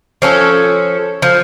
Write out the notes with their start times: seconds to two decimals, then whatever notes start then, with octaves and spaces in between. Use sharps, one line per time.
0.22 F3 C#4 A4
1.22 F3